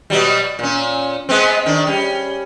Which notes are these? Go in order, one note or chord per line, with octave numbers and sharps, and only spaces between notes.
B2 F#3 G3
A#2 C#4
G#3 B3 C4
D#3 D4
G3 C#4